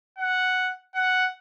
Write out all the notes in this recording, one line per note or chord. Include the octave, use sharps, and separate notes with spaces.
F#5
F#5